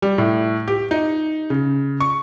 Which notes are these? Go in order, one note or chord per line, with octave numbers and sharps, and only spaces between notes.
G3
A2
G4
D#4
C#3
C#6